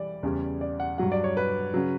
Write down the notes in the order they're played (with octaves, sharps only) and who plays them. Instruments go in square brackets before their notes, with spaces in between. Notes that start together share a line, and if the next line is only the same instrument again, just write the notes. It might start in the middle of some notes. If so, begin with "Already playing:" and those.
Already playing: [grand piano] E3 G3 D5
E2 C#3 G3
D5
F#5
G2 F#3 F#5
D5
C#5
B4
C#3 F#3